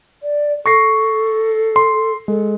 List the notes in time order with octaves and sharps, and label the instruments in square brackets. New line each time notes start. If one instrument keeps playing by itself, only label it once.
[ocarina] D5
[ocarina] A4 [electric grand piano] C#6 A#6 C7
[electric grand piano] C6
[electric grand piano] G#3 [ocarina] A4